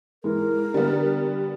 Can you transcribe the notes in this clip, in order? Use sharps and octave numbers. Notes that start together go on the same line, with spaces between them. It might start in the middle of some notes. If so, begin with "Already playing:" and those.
E3 G#3 A#4
D3 G3 B3